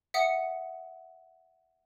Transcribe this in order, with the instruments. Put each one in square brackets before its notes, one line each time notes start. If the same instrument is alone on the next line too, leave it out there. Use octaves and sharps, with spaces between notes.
[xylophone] E5 F#5 D#6 C#7